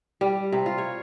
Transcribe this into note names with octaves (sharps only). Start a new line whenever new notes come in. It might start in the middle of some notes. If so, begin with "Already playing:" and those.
G3
C3
F4
C#5